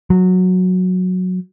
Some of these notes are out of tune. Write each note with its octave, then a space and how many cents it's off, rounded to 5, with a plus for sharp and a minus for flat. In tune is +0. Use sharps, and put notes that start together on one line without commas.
F#3 -10